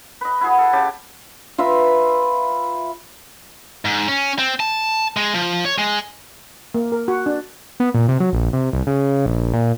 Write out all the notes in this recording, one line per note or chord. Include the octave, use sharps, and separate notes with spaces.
B4 D#5
E4 F#4 G#4
A4
C#3 G4 A5
F4 B4 E5 A#5
G#2
C#4
C4
A5
G#3
F3
C#5
G#3
A#3
A#4
F#4
D4
B3
A#2
C3
F#3
A#1
C3
C2
C#3
A#1
A#2